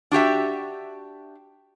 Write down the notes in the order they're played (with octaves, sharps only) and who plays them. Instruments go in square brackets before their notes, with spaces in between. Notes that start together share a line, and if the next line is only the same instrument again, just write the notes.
[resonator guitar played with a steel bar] D4 F#4 G4 E5